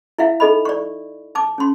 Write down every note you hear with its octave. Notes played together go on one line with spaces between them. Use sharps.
E4 E5 F5
D#4 A4 D#5 B5
D5 C#6
A5 D6
C#4 C6